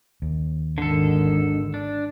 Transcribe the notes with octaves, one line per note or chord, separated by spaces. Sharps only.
D#2
G#1 D3 D#3 A4
D4